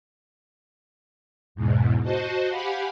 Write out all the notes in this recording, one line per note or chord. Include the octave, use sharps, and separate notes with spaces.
E2 G#2 B2
F#4 C5 D#5 A5
G4 F5 F#5 G#5 B5